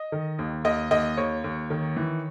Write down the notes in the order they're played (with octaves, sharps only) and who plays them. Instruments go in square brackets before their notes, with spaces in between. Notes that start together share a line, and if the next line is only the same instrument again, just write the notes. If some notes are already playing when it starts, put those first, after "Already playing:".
Already playing: [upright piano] D#5
D#3
D#2
D#2 D#5
D#2 D#5
D#2 C#5
D#2
D#3
E3